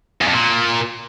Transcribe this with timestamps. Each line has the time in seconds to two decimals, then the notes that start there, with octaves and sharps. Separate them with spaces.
0.21 E2
0.28 F2
0.34 A#2